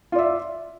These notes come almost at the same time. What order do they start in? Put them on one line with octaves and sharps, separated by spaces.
F4 D5 E5